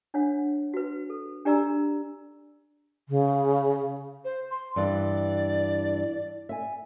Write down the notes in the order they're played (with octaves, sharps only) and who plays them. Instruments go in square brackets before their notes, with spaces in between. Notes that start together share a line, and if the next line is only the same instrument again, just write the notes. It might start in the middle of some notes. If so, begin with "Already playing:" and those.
[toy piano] D4 C#5 F#5
F#4 B4
A4
D4 G4 D5 A#5 E6
[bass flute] C#3
[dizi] C5
C6
[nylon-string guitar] G2 E3 [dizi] D5
[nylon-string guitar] E5 G#5